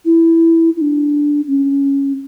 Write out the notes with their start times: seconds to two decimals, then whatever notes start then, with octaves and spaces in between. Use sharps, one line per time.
0.05 E4
0.76 E4
0.81 D4
1.48 C#4